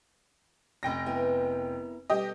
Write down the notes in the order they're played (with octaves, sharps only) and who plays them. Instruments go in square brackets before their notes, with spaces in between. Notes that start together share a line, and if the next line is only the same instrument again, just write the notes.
[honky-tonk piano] F1 G5 A#6
[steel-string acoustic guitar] B3 E4 A#4
[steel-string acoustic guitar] B2 G3 A3 [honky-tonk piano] G4 D#5